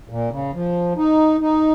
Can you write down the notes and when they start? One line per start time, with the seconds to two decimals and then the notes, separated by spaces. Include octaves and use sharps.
0.10 A#2
0.31 C#3
0.54 F3
0.97 D#4
1.41 D#4